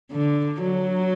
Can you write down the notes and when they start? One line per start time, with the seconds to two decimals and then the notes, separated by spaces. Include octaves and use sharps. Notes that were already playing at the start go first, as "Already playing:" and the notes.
0.12 D3
0.62 F#3